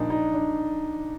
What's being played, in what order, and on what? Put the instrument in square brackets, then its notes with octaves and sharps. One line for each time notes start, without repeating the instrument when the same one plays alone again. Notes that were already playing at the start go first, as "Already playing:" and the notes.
Already playing: [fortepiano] A#1 A#2 A#3 [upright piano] D4 D#4
[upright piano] D#4
D4